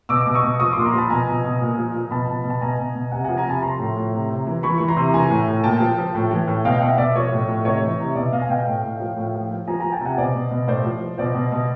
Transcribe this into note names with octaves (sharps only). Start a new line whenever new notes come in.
B2 D6 E6
B2
C#6 D#6
B2
F3 C#6 D#6
A#2 C6 D6
A#5 C6
F3 A5 B5
B2 G#5 A#5
B2
B2
A#2
F3
F3
B2 A5 B5
B2
B2
A5
B2 G#5 A#5
B2
B2
C3 F#5 G#5
F3 F#5 G#5
G#5 A#5
C3 A5 B5
F3 A#5 C6
A2
A2
C3
C3
E3
E3 B5 C#6
E3 C#6
A#5 C6
C3
E3 G#5 A#5
A2
A2
A#2 G5 A5
F3
F3
A2
E3
A2
B2 F5 G5
B2 E5 F#5
B2 D5 E5
F3 C#5 D#5
A2
A2
C3 C#5 D#5
E3
C3
B2 D5 E5
B2 D#5 F5
G#5
B2 F5 G5
A2
A2
F3
A2
F3
F3
F3 G#5 A#5
F3 G#5 A#5
G5 A5
C3 F#5 G#5
B2 C5 D5
B2
B2
A2 C5 D5
F3
F3
B2 C5 D5
B2
B2